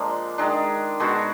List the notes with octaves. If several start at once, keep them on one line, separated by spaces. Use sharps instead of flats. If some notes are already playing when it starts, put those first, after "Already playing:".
Already playing: A#2 F3 G#3 D4
D#3 G#3 D4
B2 G#3 D4 F#4